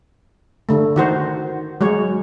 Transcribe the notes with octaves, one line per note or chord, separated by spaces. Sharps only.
D3 A3
D#3 F#4 C5
F#3 G#3 C#5